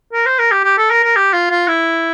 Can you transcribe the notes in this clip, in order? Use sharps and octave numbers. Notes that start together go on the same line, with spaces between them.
A#4
C5
A#4
G4
G4
A4
A#4
A#4
G4
F4
F4
E4